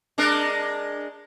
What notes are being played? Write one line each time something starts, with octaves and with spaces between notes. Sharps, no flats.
G#3 D4 A#4